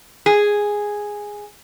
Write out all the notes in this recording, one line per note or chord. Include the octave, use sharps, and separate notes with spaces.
G#4